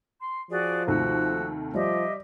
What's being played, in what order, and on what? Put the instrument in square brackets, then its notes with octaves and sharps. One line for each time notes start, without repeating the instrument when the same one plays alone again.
[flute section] C6
[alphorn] F3 [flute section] F#4 G#4 D5
[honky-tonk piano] D#2 C3 A3 [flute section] F#4 E6
[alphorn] F3 [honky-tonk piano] G3 [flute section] G4 D#5 E5